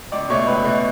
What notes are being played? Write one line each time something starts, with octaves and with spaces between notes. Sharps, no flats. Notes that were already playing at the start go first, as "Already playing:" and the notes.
C#2 D5 D6
B2 A3 C#5 C#6
C#2 B4 B5
B2 A3